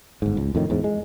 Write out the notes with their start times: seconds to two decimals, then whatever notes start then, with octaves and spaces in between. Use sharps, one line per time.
0.22 G1 G#2
0.37 C#2
0.55 F2 A2 D#3
0.70 E2 G#2
0.84 G#3